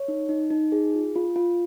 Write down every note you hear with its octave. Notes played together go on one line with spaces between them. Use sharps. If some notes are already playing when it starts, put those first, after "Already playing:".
Already playing: C#5
D#4
D#4
D#4
G#4
F4
F4
F4